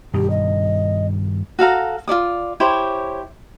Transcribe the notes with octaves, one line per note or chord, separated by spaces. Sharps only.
G2 B2 D#3 G4
D#5
F#4 A4 F5 A#5
F4 A4 D5 D#6
E4 G4 C5 C#5